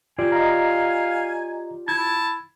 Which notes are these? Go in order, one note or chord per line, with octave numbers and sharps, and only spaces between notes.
F4 G4 D5 G#5
D#5 F5 A#5
E4 A5 G#6